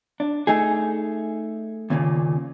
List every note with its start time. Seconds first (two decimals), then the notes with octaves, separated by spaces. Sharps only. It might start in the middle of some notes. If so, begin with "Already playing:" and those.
0.20 D4
0.47 A3 D#4 G#4
1.90 D#2 A#2 C#3